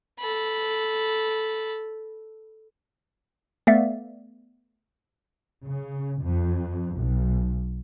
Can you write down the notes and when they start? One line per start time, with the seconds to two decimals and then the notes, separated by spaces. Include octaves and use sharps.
0.19 A4 B5
3.67 A3 B3 D5 E5 F5
5.65 C#3
6.21 F2
6.96 B1